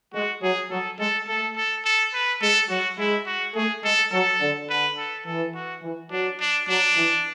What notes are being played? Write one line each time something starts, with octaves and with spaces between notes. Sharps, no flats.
G#3 F#4
F#3 G#4
F#3 A4
G#3 A4
A3 A4
A4
A4
B4
G#3 A4
F#3 F#4
G#3 E4
F#4
A3 G#4
G#3 A4
F#3 A4
D3
D3 B4
A4
E3 A4
F#4
E3
F#3 D4
D4
F#3 D4
E3